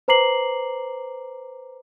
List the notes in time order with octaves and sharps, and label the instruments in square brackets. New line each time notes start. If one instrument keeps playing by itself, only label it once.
[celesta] B4 C5 A#5 D6 C7 F#7